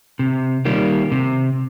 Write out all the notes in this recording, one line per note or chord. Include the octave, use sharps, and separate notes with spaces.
C3
D#3 G3 A#3
C3